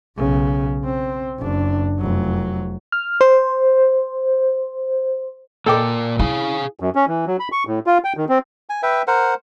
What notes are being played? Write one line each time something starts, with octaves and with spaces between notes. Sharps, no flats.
B1 C#3
C4
F#1 D4
F1 F#3
F6
C5
A#2 A#3 A4 G5 D6
E4 G#4 F5 G#5
F#2
C#4
E3
F#3
B5
C#6
A2
F4
G5
D#3
C4
G#5
B4 E5 G5
A#4 C5 F#5